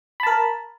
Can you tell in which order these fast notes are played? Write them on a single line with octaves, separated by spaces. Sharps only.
B5 A5 A#4